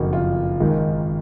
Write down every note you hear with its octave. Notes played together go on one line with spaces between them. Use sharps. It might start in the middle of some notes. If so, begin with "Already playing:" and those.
Already playing: F#1 F2 D#3 F#4
F4
G#1 G#2 D#3